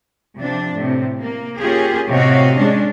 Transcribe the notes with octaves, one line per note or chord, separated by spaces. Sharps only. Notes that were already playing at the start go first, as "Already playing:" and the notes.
C3 F3 D4
A2 C3
A#3
A#3 C#4 F4 G4 G#4
A2 C3 F#4 C#5 D#5 F5
G#3 C#4 D4